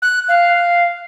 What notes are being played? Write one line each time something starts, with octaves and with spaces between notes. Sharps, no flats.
F#6
F5